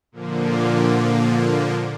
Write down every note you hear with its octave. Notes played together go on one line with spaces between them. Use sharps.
A#2 D3 F3 A#3